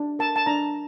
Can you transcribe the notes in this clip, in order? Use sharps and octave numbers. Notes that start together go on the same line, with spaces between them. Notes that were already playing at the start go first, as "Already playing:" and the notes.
Already playing: D4
A#4 A5
A5
D4 A#5